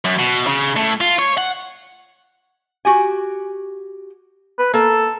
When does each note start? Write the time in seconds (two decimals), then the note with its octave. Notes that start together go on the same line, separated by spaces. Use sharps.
0.05 F#2
0.19 B2
0.47 C#3
0.76 A2
1.01 F4
1.19 C#5
1.38 F#5
2.85 F#4 G4 G#5
4.59 B4
4.74 A#3 A4